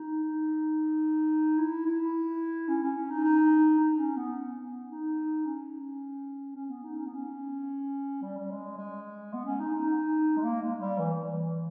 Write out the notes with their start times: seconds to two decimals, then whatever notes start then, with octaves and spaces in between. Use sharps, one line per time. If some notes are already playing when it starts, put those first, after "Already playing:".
Already playing: D#4
1.58 E4
1.85 E4
2.69 C#4
2.83 C#4
2.96 C#4
3.10 D#4
3.24 D#4
3.80 D#4
3.98 C#4
4.16 B3
4.89 D#4
5.46 C#4
6.56 C#4
6.69 B3
6.84 D#4
6.98 C#4
7.06 B3
7.13 C#4
8.22 G3
8.38 G3
8.50 G#3
8.77 G#3
9.33 B3
9.46 C#4
9.60 D#4
9.74 D#4
10.37 G#3
10.43 A#3
10.62 G#3
10.81 G3
10.99 E3
11.21 E3